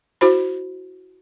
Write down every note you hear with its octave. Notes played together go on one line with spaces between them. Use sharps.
E4 F#4 C5 B5